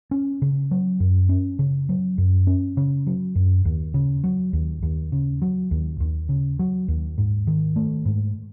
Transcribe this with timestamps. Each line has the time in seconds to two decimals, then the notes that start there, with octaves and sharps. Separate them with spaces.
0.11 C#4
0.42 C#3
0.71 F#3
1.00 F#2
1.29 C#4
1.59 C#3
1.89 F#3
2.18 F#2
2.47 C#4
2.77 C#3
3.07 F#3
3.35 F#2
3.65 D#2
3.94 C#3
4.24 F#3
4.53 D#2
4.83 D#2
5.12 C#3
5.42 F#3
5.71 D#2
6.00 D#2
6.29 C#3
6.59 F#3
6.88 D#2
7.18 G#2
7.47 D#3
7.76 A3
8.05 G#2